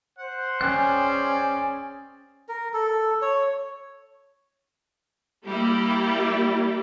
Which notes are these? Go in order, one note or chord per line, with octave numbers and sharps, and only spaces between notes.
C5 F#5
C#4 G#4 D5 G5 F#6
A#4
A4
C#5
G3 A#3 E4 G4